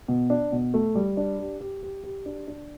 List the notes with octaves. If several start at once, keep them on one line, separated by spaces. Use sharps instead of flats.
B2
D4
B2
A3
G3
D4
G4
G4
G4
G4
D4
D4